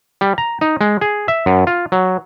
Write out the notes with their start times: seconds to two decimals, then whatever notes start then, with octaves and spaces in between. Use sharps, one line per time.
0.21 G3
0.38 A#5
0.61 D#4
0.81 G#3
1.01 G#4
1.28 E5
1.46 F#2
1.67 F4
1.92 F#3